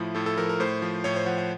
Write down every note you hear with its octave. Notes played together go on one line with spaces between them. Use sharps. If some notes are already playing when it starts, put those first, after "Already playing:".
Already playing: A2 F3 E4
A2 A4
A4
F3 A#4
A#4
A2 C5
F3
A2 C#5
C5
F3 F#5
F#5